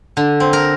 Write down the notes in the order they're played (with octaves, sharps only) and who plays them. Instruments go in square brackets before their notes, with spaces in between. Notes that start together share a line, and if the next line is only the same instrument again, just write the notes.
[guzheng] D3
C4
A#4